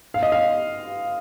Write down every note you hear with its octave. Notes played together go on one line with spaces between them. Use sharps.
F5
D#5
F5